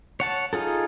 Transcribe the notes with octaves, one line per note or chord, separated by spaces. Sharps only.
C#5 F#5 A5
D#4 F4 G#4 A4